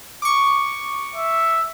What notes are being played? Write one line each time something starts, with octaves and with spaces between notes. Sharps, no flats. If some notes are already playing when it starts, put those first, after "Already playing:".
C#6 D6
E5